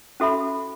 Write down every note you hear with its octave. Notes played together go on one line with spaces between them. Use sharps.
C#4 F#4 A4 E5 B5